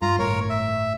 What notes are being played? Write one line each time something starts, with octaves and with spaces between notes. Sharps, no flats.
G2 F4 A#5
G1 A2 A#4 C#5
E5